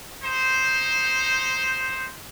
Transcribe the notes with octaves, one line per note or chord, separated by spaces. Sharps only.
D#4 C5